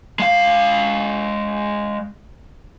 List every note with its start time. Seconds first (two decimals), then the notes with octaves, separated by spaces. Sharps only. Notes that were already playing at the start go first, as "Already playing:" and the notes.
0.19 G#3 F5